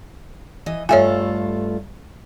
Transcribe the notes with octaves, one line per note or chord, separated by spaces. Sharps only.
E3 D#5
G2 A3 F4 C#5 E5 G#5